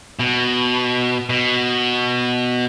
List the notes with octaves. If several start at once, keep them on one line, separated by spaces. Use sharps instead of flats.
B2
B2